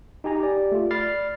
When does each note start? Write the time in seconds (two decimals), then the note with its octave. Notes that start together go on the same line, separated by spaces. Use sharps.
0.24 D#4 G4 G#5 A#5
0.40 G4 D5
0.72 A3 F4
0.91 D5 B5 F6 A6 C7